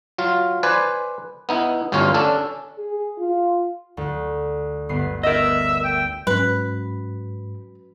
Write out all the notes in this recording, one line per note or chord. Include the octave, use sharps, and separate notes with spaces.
F#3 F4
B4 C5 D5 G#5
B3 D#4 E4
G1 D2 G2 C#4 F4 C#5
C#4 D4 A4
G#4
F4
D2
G1 B3 C7
A#4 D#5 E5
G5
G#2 F#3 C#4 B4